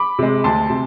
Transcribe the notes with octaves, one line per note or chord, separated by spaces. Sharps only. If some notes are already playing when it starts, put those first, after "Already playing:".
Already playing: B5 D6
C3 G#3
D2 A5 C6
C3